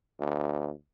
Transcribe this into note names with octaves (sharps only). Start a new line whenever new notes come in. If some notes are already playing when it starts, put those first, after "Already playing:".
D2